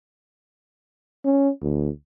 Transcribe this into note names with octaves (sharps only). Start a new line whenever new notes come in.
C#4
D2